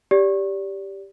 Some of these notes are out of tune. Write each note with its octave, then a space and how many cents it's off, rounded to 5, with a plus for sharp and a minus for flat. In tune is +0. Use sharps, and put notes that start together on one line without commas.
G4 +0 D5 -25